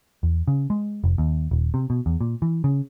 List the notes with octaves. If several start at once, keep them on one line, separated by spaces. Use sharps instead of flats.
E2
C#3
G#3
F1
D#2
D#1
C3
B2
E2
A#2
E3
C#3